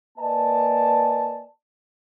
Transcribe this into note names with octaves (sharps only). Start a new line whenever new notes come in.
A#3 B4 D5 D#5 G#5 A5